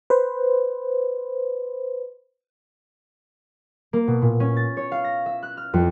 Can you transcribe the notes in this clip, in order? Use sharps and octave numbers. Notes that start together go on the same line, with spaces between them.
B4 C5
A#3
B2
A#2
C#4
A6
C#5
F5
A#6
E5
F#6
F6
F2